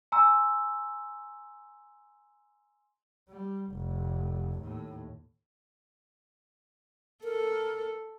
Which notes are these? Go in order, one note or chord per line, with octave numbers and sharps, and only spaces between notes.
G#5 A#5 C6 E6
G3
F1 A2
D#2 A2
A4 A#4